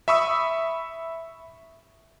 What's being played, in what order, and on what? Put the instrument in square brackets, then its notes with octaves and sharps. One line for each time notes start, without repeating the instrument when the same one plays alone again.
[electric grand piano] E5 B5 C#6 D#6 E6